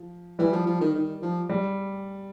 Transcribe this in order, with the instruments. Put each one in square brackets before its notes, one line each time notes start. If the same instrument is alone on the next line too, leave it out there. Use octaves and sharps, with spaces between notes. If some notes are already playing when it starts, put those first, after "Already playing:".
Already playing: [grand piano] F3
[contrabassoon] E3 [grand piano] G3
[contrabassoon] F3
F3
D#3
D#3
F3
[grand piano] G3